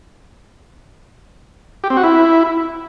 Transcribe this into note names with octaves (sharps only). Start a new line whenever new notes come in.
G4
C4
F#4
E4